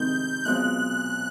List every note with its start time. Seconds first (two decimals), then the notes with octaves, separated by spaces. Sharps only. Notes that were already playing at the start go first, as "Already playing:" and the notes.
Already playing: F2 C3 D#3 G#3 G6
0.45 B1 B2 G#3 C4 F4 F#6